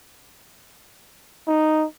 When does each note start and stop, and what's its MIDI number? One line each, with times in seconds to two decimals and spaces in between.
1.47 1.86 63